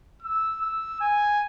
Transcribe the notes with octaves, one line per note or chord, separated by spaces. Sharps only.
E6
E6
G#5